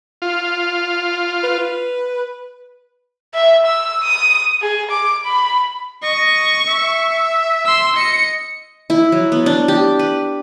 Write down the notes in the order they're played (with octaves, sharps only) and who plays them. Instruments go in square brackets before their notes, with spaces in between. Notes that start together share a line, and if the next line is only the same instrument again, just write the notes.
[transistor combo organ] F4
[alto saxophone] B4
[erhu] E5
E6
D#6
G#4
D6
B5
[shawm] D#5 [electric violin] C#6
[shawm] E5
[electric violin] C6 E6
[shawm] D#5 [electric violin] C#7
[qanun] E4
F#3
B3
D4
G4
B4